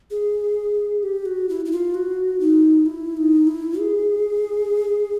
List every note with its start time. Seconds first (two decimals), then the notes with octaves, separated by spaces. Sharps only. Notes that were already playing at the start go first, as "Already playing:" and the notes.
0.11 G#4
1.03 G4
1.26 F#4
1.49 E4
1.65 E4
1.72 F4
1.94 F#4
2.40 D#4
2.86 E4
3.17 D#4
3.47 E4
3.79 G#4